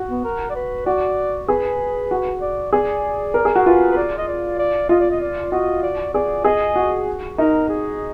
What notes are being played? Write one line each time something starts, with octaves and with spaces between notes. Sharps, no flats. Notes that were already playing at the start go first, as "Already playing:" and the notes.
Already playing: F#4
B3
A#4
D5
B4
F#4 D5
G#4 B4
F#4
D5
G#4 D5
A#4
G#4
F#4
F4 B4
B4
D5
D#5
D5
D5
F4 D#5
D5
D#5
D5
F#4 D#5
D5
G#4 D5
G#4 D#5
F#4
D#4 A#4
G#4